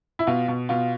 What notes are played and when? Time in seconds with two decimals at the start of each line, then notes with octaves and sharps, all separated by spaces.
0.19 E4
0.27 B2 F4
0.48 B2
0.69 B2 F4